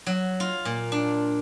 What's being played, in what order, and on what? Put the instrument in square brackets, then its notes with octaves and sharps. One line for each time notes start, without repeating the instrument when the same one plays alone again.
[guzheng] F#3
F4
A#2
D4